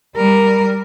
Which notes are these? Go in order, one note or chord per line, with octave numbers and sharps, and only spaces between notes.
G3 A#4